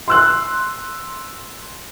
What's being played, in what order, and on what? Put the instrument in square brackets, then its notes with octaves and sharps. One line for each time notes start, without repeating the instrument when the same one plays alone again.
[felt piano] C6 E6 F#6